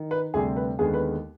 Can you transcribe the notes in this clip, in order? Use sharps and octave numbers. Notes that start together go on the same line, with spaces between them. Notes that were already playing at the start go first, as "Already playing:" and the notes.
Already playing: D#3
B4
D2 C3 G3 G#4
B4
D#2 D3 G#3 B3 G#4
B4